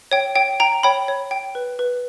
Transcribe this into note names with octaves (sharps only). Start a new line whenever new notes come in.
C#5 G5
C#5 G5
G5 A#5
C#5 G5 B5
C#5
G5
B4
B4